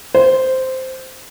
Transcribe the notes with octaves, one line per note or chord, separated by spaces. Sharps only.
C5